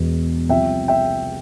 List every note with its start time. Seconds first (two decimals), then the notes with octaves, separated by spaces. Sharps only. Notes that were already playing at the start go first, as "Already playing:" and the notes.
Already playing: E1 E2 B2
0.49 C2 C3 F3 E5 G5
0.88 E5 G5